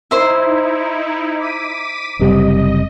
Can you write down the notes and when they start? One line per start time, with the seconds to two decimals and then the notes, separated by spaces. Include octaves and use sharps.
0.11 D#4 E4 C5 E5
1.38 D6 B6 D#7
2.19 F#1 C3 G3 D#5